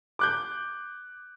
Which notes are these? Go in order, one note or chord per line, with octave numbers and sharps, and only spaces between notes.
D6 F#6 G6